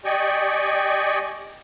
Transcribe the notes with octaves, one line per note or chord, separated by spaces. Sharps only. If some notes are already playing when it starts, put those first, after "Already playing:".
G4 D5 D#5 G5 G#5 C#6